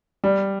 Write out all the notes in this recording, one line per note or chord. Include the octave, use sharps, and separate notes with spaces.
G3